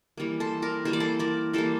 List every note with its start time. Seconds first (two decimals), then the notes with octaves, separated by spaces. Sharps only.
0.17 E3 G3 A#3
0.40 A4 C5
0.62 A#4 D5
0.85 E3 G3 A#3 C5
0.93 D5
1.00 A4 C5
1.19 A#4 D5
1.53 E3 G3 A#3 A4 C5